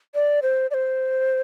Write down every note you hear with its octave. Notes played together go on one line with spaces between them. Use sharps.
D5
C5
D5
C5